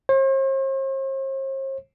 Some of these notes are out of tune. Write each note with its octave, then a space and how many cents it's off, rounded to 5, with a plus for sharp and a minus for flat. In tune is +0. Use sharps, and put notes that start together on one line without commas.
C5 +45